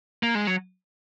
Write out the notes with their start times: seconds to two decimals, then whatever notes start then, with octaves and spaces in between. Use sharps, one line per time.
0.23 A#3
0.35 G#3
0.47 F#3